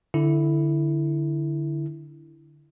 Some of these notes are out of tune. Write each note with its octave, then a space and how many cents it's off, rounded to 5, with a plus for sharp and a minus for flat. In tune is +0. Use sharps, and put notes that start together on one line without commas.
D3 +0 E4 +0